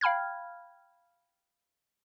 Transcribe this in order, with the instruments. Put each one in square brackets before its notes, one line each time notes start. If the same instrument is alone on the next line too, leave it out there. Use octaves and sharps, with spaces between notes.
[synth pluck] F5 G5 B5 F6 G#6